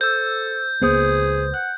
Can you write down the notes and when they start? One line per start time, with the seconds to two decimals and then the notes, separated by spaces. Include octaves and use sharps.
0.01 A4 C5 E6 G6
0.82 C#2 A#3 B3 G#4 B4 C5 D#6
1.54 F#5 F#6